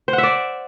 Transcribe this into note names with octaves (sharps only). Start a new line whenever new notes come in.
C5
F#5
E5
D5